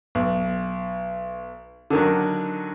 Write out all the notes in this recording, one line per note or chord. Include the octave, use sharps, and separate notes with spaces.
B1
D3 D#3 F#3